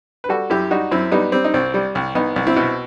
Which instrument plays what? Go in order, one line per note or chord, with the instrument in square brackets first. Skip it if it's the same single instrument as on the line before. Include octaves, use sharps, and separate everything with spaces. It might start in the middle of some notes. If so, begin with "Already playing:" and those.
[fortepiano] B4
G3 F#4 A4
F#2 E4 G4
G3 D#4 F#4
F#2 C4 E4
G3 B3 D#4
G3 C4
D#4
C2 C4
G3
C2
C2 B3 D#4
C2
C4 E4
B2